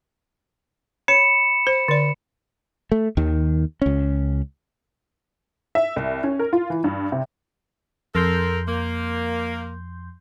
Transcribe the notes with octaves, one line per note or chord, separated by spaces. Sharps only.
C#5 B5 C#7 E7
C5
D3 D5
A3
D#2 D#3
C#2 C#4
E5
C2
C#4
A#4
F4
E3
G2
C3
F2 A4 A#4 C6 G6
A#3